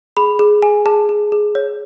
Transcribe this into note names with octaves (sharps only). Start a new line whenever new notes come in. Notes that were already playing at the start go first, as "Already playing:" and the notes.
G#4 B5
G#4
G#4 G#5
G#4 A5
G#4
G#4
C#5